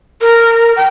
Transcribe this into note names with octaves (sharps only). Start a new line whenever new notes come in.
A#4
G5